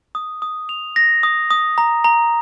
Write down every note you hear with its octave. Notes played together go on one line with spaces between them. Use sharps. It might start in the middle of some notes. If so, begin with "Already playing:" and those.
D#6
D#6
F7
A#6
D#6
D#6
A#5
A#5